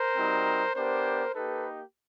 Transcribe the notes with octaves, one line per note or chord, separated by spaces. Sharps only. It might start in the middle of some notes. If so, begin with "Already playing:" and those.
Already playing: A#4 C5
G3 C4 D#4 F#4
B3 D4 G4 A#4 C5
A#3 D#4 G4 A4 B4